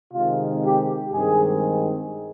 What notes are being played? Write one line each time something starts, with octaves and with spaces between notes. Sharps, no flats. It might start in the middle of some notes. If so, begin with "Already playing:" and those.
C3 D#3 G#3 C4 F4
G4
G2 D#3 G#3 C4 G#4